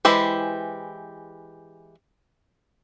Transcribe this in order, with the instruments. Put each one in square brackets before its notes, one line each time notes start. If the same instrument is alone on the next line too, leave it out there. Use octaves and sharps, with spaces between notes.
[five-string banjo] E3 G#3 E4 G4 C5